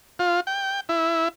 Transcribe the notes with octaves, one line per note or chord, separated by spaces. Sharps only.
F4
G5
E4